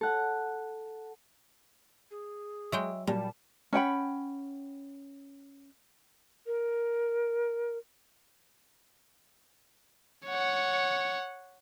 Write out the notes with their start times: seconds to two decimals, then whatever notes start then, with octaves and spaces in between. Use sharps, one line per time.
0.01 A4 F#5
2.11 G#4
2.72 F#3 G#3 E5 G5
3.07 A#2 F#3 G3 A5
3.73 C#4 F#5 G5 B5
6.46 A#4
10.26 C#5 F#5